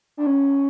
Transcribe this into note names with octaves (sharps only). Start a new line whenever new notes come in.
D4
C#4